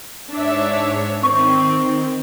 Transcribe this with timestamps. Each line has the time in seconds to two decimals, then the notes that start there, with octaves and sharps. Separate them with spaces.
0.31 G#2 D4 C#5 E5
1.23 D#3 C4 C#6